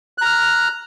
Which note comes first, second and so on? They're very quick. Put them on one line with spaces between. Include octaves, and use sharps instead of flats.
F#6 A#5 F6